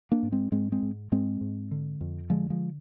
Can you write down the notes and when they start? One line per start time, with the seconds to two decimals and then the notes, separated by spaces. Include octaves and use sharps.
0.12 A#3 D4
0.23 G#2
0.32 G#3 C4
0.52 G#2 G#3 C4
0.72 G#3 C4
0.82 G#2
1.12 G#2 G#3 C4
1.41 G#2
1.71 D3
2.01 F2
2.30 D3 F3 G#3
2.50 F3 G#3